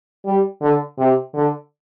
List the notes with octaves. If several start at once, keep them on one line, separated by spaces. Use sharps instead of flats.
G3
D3
C3
D3